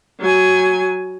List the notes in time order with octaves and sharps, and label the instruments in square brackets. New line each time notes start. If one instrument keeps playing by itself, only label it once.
[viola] F#3 G#5